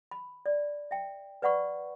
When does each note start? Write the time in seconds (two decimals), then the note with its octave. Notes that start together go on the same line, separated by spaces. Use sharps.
0.11 B5
0.46 D5
0.91 E5 G5
1.42 B4 D5 F#5 B5 C#6